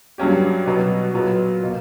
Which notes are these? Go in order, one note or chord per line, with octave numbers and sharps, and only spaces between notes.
G2 F#3 C#4 G4
B2 F#3 B3 F#4
A#2 F#3 B3
B2 A#3